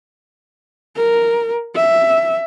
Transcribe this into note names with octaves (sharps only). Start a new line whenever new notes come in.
A#4
E5